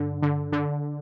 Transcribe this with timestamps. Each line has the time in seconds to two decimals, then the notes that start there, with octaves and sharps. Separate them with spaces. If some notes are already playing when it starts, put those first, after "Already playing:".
Already playing: G2 D3
0.22 D3
0.52 D3